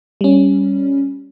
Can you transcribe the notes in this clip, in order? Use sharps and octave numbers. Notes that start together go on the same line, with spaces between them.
G3 C#4